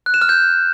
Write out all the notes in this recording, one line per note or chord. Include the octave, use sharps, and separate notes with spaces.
F#6
E7
F6
G6